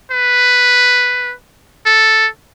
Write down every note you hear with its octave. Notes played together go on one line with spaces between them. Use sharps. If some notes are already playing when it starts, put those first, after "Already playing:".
B4
A4